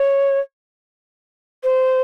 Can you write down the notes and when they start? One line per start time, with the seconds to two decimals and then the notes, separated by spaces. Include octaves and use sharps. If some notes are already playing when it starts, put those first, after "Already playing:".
Already playing: C#5
1.64 C5